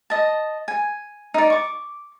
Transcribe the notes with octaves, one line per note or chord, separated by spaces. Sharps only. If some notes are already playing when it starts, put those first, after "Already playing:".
D#5 A5
G#5
D#4 D5
C#6 D6